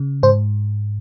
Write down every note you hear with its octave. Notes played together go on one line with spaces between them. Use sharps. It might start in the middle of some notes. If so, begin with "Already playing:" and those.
Already playing: C#3
G#2 C5